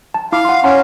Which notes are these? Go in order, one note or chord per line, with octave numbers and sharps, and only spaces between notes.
A5
E4 F5 B5 D6
F#5 C6
C#4 F#5 A#5 C6